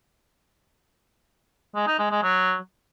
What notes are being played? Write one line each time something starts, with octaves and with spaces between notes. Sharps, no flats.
G#3
D#4
G#3
G#3
F#3